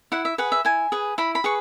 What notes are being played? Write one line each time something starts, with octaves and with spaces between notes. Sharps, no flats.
E4 F#5
E5
G#4 B4 F#5
E5
E4 G#5
G#4 B4
E4 B5
B5
G#4 B4 C#6